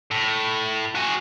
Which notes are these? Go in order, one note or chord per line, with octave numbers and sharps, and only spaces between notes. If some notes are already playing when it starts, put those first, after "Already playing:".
A2
F#4 G#4